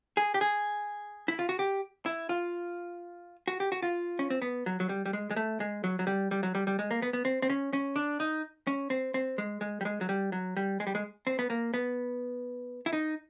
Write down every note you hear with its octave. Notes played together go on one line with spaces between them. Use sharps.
G#4
G4
G#4
E4
F4
F#4
G4
E4
F4
F#4
G4
F#4
F4
C#4
C4
B3
F#3
F#3
G3
G3
G#3
G#3
A3
G#3
F#3
F#3
G3
G3
F#3
G3
G3
G#3
A#3
B3
B3
C4
C4
C#4
C#4
D4
D#4
C#4
C4
C4
G#3
G#3
G3
G#3
F#3
G3
F#3
G3
G#3
G3
G#3
C4
B3
A#3
B3
E4
D#4